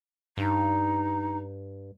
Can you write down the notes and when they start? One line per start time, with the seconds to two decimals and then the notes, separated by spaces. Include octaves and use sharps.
0.37 G2 D#4